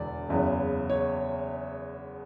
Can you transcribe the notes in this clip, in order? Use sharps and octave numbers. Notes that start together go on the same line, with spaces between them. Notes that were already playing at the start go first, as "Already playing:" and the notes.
Already playing: E1 E2 D3 D5
F#1 E2 C#3 F#3 B3
C#5